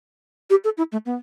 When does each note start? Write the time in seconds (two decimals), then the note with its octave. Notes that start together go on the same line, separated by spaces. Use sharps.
0.50 G4
0.64 A4
0.78 E4
0.92 A3
1.06 B3